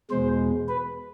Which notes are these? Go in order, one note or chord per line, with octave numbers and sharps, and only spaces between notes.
E2 B2 G#3 C5
B4